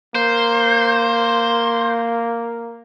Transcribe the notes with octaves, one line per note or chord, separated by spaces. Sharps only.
A#3 C5